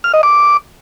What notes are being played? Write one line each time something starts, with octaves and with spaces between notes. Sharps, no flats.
F6
D#5
D6